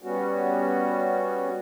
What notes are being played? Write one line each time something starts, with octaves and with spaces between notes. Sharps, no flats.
G3 B3 C#4 F#4